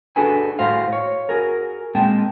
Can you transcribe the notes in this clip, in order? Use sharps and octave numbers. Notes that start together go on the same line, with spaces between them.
D4 F#4 G#4 A4 B4 G#5
A2 F#4 C5 F5
C#5
F#4 G#4 A#4
A#2 G#3 C4 G5 A5